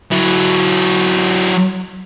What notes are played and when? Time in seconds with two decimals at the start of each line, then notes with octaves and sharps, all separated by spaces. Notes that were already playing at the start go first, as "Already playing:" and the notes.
0.11 F#3 E4